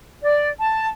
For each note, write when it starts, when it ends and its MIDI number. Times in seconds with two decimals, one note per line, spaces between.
0.23 0.48 74
0.60 0.88 81